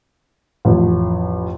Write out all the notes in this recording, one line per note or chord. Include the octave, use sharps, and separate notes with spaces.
A1 F2